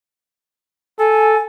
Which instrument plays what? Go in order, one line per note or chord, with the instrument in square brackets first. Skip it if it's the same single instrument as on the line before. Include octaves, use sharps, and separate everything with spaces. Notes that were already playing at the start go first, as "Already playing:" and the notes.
[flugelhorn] A4 [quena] G#5